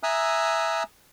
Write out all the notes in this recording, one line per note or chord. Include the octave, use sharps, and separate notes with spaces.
E5 G#5 A#5 D#6 E6 F#6